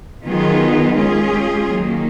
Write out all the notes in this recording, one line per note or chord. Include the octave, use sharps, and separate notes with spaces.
D#3 F#3 B3 F4 G#4
G#3 C#4 F4 G#4
D#3 F#3 A#3